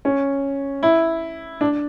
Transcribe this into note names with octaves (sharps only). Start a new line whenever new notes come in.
C#4
E4
D4